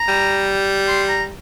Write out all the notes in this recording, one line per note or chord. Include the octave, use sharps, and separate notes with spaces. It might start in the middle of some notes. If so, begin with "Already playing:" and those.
Already playing: A#5
G3
C6
A#5